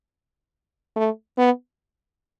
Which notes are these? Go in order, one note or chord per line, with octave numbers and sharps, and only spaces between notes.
A3
B3